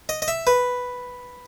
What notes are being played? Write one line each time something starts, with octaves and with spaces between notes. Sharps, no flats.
D#5
D#5
E5
B4